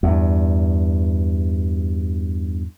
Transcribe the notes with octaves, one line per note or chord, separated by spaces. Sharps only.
E2 G2